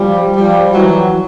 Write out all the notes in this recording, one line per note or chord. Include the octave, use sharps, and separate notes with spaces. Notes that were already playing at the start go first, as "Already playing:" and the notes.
Already playing: F3 G3
F3 G3
E3 F#3